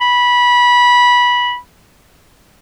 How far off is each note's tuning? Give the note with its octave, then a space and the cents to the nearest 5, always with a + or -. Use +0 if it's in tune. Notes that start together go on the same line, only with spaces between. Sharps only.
B5 -20